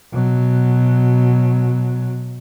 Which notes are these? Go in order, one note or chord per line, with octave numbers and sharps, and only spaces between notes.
B2 F#3